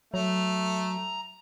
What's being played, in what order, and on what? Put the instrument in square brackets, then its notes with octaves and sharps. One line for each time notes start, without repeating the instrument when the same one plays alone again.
[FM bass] F#3 [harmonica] A3 [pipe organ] A#5